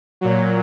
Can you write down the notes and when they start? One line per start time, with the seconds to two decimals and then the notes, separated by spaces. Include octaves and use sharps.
0.21 A#2 F#3